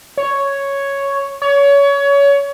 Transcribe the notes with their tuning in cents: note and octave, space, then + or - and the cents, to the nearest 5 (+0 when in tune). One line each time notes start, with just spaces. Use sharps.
C#5 +0
C#5 +25